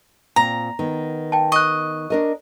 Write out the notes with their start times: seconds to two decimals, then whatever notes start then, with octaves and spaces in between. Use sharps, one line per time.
0.36 A#2 C4 A#5
0.79 D#3 B3
1.32 G5 A5
1.52 D#5 C#6 F#6
2.10 D4 A#4 D#5